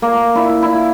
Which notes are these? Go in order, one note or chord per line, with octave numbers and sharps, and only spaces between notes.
A#3
E4
E4